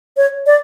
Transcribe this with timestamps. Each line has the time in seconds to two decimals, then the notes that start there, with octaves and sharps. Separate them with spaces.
0.17 C#5
0.46 D5